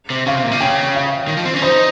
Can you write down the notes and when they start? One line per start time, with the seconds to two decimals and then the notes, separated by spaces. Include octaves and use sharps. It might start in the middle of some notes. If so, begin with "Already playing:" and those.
0.10 C3
0.26 C#3 F5
0.35 C3
0.43 A#2
0.51 C3
0.60 C#3 G5
0.95 F5
1.28 D#3
1.37 F3
1.45 C4
1.54 C#4
1.62 D#4 C5